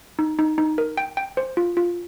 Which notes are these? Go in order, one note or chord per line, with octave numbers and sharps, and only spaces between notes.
D#4
D#4
D#4
A#4
G5
G5
C5
F4
F4